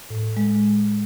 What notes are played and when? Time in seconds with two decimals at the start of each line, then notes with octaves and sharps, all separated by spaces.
0.10 A2
0.37 G#3